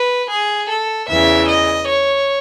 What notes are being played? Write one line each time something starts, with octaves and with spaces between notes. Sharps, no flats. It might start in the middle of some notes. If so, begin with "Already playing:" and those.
Already playing: B4
G#4
A4
E2 C#3 E3 E5
D#5
C#5